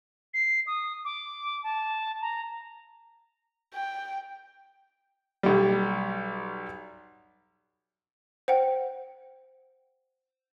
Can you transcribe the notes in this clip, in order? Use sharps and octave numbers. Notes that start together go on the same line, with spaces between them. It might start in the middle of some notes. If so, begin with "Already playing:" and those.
C7
D#6
D6
A5
A#5
G5
B1 G3
C5 F#5 G5